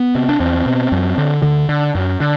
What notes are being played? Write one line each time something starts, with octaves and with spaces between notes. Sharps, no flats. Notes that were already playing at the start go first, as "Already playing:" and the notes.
Already playing: B3
C3
D4
E2 C4
B2
F#2
D3
D2 D3
D3
F#2
D3